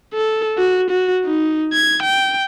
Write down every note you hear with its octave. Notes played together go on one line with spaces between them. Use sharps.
A4
F#4
F#4
D#4
G#6
G5